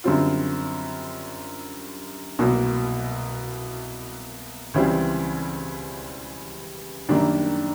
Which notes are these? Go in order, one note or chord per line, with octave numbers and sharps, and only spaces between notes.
F#2 D3 G3 C4 F4
C2 B2 F#3 A#3
C#2 C#3 E3 G3 C4
F#2 D#3 G3 A#3 D4